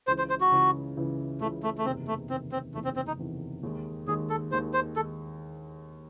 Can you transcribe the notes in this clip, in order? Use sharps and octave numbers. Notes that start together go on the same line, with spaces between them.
C#2 C#3 E3 C5
C5
C5
F#4
C#2 C#3 E3
C#2 C#3 E3
C#2 C#3 E3 A3
A3
A3
F#1 E2 C3 D#3 C4
A3
F#1 E2 C3 D#3 C4
C4
F#1 E2 C3 D#3 A3
C4
C4
D#4
F#1 E2 C3 D#3
D#2 D#3 G#3
D#2 D#3 G#3 G#4
A4
D#2 D#3 G#3 C5
C5
D#3 G#3 A4